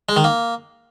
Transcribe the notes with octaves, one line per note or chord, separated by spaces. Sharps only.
G#3
D#3
A#3